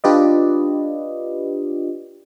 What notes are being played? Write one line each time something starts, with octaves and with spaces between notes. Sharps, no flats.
D4 F4 G4 B4 D5 D#5